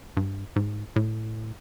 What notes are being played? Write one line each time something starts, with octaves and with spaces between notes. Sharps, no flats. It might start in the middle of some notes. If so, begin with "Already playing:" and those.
G2
G#2
A2